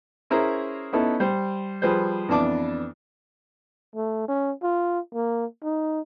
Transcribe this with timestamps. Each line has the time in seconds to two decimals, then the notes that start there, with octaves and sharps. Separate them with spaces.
0.30 C#4 E4 G#4 A#4 C5 A#5
0.93 B3 C#4 D#4 E4 A4
1.20 G3 C5
1.82 F3 G3 G#4 B4 C5
2.29 F2 E3 B3 D4 A5 D6
3.95 A3
4.28 C#4
4.63 F4
5.14 A#3
5.63 D#4